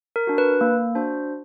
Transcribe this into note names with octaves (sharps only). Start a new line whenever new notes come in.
A#4
D4 F#4
B4
A#3
D4 F#4 C5